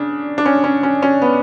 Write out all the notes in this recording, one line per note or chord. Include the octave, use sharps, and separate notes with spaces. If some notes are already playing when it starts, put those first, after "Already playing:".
Already playing: C#3 D4
D4
C#4
C#4
C#4
C#4
B3